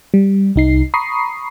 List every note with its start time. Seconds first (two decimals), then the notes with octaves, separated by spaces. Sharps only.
0.14 G3
0.56 C2 D#4 C7
0.94 A#5 B5 C#6 D#6 C7